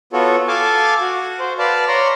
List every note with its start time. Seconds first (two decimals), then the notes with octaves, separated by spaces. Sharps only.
0.13 B3 F4 F#4 A4 C#5
0.48 A4 F5 G#5 A5 D6
1.01 F#4
1.39 C5
1.58 B4 D5 F5 A5
1.88 C#5 D5 A#5 C6